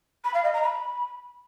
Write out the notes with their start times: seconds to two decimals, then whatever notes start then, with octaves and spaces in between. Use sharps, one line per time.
0.24 B5
0.34 F5
0.44 D#5
0.53 A#5
0.63 B5